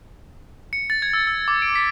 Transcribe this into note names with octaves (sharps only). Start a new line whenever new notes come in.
C#7
A6
G#6
E6
E6
D6
D7
B6